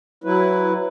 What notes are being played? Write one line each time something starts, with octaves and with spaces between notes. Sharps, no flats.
F#3 E4 B4